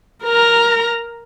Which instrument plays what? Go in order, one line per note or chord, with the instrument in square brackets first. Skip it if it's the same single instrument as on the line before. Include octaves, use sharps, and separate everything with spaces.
[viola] A#4 A#5